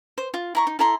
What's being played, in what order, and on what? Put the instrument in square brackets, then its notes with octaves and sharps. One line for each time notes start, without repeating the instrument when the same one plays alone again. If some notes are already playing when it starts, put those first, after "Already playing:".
[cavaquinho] C5
F4
E4 A#5 C#6
D#4
E4 A4 A#5 C6